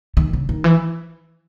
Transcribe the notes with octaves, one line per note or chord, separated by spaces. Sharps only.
D#3
C#3
D#3
E3